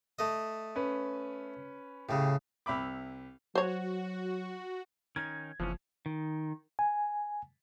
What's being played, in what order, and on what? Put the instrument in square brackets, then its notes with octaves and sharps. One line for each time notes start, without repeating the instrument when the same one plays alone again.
[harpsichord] A3 D#5
[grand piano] C#4 B4
[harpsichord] A2 C#3 [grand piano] G4 G#4
[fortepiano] C2 E5 B5 D6
[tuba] F#3 [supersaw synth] F#4 [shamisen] C5 C#5
[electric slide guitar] D#3 C#4 D#4 [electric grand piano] G#6
[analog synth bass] F#1 [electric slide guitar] E2 E3 C#4 [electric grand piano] F3
[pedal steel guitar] D#3
[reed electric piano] G#5